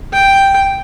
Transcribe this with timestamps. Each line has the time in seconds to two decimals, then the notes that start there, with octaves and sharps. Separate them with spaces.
0.13 G5